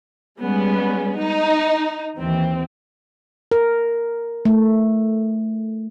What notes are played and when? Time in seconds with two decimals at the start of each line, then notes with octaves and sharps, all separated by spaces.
0.40 G3 G#3 B3 C#4
1.16 D#4
2.18 D#2 E3 C4
3.52 A#4
4.45 A3